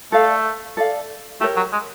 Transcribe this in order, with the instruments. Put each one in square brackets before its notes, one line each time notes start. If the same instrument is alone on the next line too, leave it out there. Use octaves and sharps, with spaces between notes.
[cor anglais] A3 [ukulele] A4 D5 F5
[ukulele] A4 D5 F5
[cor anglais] A3 [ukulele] G4 A#4 C#5
[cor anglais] F#3
G#3